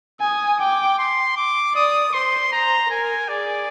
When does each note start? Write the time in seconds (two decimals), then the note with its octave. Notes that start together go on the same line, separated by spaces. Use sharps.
0.21 G#5 D#6
0.60 G5 D6
0.99 C6
1.36 D6
1.75 D5 D#6
2.13 C5 C6
2.52 C5 A#5
2.90 A#4 G#5
3.29 G#4 D5